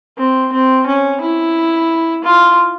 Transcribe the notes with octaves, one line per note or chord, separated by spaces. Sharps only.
C4
C4
C#4
E4
F4